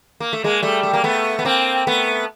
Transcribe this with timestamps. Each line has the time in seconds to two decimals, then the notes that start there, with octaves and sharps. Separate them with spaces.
0.20 A#3
0.33 A3
0.44 G#3 A#3
0.62 G3 A3
0.83 A3
0.93 A#3
1.04 A3 B3
1.39 B3
1.45 A#3 C4
1.87 A3 B3